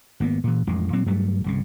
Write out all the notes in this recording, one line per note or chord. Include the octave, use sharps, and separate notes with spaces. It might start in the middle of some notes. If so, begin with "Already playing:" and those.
G#1 A#3 B3
A#2 E3
A1 F2 G#3
A#2 F#3 C4
G2 F#3 G3 A3
G1 C2 C#3